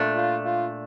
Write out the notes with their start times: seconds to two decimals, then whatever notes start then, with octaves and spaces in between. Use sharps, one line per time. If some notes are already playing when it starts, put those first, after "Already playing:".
Already playing: A#2 A3 D4
0.15 F4
0.45 F4